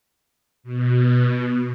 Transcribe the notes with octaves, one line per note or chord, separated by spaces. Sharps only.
B2